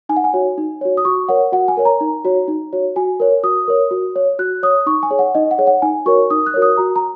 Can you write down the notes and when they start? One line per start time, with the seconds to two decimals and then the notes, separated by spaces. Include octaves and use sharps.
0.09 D#4 G#5
0.17 F#5
0.24 G#5
0.33 F#4 C#5
0.58 D#4
0.81 F#4 C#5
0.97 D#6
1.05 F#4 C#6
1.28 A#4 C#5 F#5
1.52 F#4 F#5
1.68 G#5
1.77 A#4 C#5
1.85 A#5
2.01 D#4
2.25 F#4 C#5
2.48 D#4
2.73 F#4 C#5
2.96 F#4 G#5
3.20 A#4 C#5
3.43 F#4 D#6
3.68 A#4 C#5
3.91 F#4
4.16 C#5
4.39 F#4 F#6
4.63 C#5 D#6
4.86 D#4 C#6
5.03 G#5
5.11 G#4 C#5
5.19 F#5
5.35 D#4 D#5
5.51 F#5
5.58 G#4 C#5
5.67 F#5
5.82 D#4 G#5
6.06 F#4 A#4 C#5 C#6
6.30 D#4 D#6
6.46 F#6
6.54 F#4 A#4 C#5
6.62 D#6
6.77 F#4 A#5
6.96 A#5